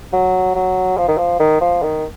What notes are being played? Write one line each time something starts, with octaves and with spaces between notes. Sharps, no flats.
F#3
F#3
F3
D#3
F3
D#3
F3
D#3